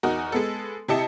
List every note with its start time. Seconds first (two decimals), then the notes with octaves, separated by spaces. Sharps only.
0.03 E2 D#4 F#4 A#4
0.32 G#3 B3 A4
0.88 C3 E4 G4 D#5 A5 C#7